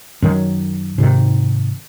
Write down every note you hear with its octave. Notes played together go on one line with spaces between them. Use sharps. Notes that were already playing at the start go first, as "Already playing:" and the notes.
F#2 D#3 F#3
G#2 C3 D#3